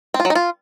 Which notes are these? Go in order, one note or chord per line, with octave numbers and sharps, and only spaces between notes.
C4
F4
F#3
D#4
F4